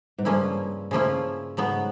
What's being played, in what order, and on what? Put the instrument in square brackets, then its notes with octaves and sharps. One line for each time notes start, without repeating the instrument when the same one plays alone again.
[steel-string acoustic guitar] G#2
[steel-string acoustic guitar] G2 [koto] C#3 F3 A#3 C#4 E4
[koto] C#3 F3 A#3 C#4 E4
[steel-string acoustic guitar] G#2 [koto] C#3 F#3 B3